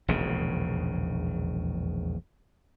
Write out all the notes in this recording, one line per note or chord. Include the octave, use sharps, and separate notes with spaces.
E1 A#1 D#2 C#3